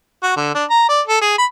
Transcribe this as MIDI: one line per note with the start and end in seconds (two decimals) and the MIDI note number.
0.23 0.36 66
0.36 0.55 50
0.55 0.64 62
0.70 0.84 82
0.89 1.01 74
1.07 1.21 69
1.21 1.35 68
1.38 1.45 83